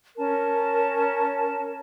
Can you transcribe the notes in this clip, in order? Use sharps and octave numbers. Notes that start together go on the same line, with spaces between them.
C#4 A#4 A5